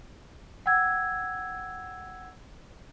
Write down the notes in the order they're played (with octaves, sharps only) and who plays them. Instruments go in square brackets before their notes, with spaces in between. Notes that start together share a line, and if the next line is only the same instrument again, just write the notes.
[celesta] F#5 G5 E6 G#6